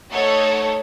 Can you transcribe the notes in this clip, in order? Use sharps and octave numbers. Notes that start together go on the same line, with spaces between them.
A3 D#4 A4 C#5 F#5